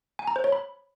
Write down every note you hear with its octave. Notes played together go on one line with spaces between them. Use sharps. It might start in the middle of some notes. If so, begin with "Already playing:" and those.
G#5
A#5
C5
C#5
B5